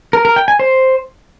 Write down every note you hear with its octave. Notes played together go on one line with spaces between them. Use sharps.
A#4
A#4
G5
G#5
C5